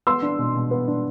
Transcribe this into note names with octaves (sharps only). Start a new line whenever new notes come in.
B3 C6 E6
D4
B2
B2
B3
D4